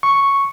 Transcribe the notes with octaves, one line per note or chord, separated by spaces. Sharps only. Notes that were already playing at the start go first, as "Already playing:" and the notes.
C#6